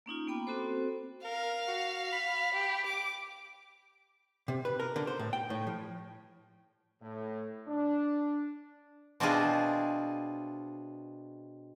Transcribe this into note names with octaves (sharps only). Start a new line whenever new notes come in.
A#3 C#4 D#4 F4
A#3 B3 G5 B5 D6
C4 F#4 A4 C5
A#4 F5
F#4
B5
G4
D6
C3
B4
A#4
D3
C5
A2
G5
A2
F3
A2
D4
B2 C4 D4 E4 F4 G#4